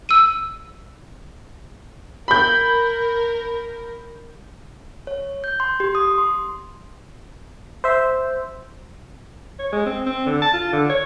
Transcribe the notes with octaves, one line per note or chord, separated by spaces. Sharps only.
E6 D#7
A#4 B5 G6
C#5
G6
C6
G4
D#6
C6
C5 E5
C#5
G#3
C4
C4
D3
A5
F4
D3
C#5